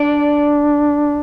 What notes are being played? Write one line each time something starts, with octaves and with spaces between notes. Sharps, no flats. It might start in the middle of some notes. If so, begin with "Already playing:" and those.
Already playing: D4 D5